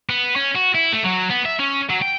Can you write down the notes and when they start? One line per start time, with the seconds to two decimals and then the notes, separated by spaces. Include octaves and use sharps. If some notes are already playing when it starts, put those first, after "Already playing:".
0.09 B3
0.36 C#4
0.55 F#4
0.75 E4
0.93 A3
1.04 F#3
1.30 B3
1.45 E5
1.59 C#4
1.89 F#3
2.02 G5